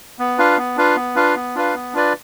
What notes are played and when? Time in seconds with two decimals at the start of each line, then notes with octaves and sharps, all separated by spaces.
0.19 B3
0.38 D4 F4 B4 F5
0.58 B3
0.77 D4 F4 B4 F5
0.96 B3
1.15 D4 F4 B4 F5
1.36 B3
1.55 D4 F4 B4 F5
1.74 B3
1.94 D4 F4 B4 D5